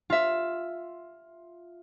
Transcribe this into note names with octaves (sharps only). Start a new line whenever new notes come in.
F4 E5